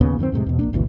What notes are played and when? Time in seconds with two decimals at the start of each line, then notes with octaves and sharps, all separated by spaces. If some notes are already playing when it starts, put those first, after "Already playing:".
0.01 D#2 A#2 C#3 B3
0.19 F#2 D#3 A#3 C4
0.32 F2 A2 C3 G#3
0.46 E2 B2
0.59 A#1 A#3 D4
0.73 G#1 D2 B2 E3